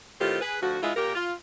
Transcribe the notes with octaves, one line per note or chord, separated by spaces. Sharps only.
A2 D#3 C4 F4 G4
G#4 B4
D2 F3 F#4
G#2 G#3 E4 F4
A#2 A#3 G4 A#4
F4